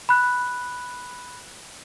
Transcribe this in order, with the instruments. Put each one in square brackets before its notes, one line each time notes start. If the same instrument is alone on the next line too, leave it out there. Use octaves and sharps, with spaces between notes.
[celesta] B5 F#6